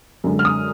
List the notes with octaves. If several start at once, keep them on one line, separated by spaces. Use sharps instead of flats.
F#2 D3 G#3
F6
D#6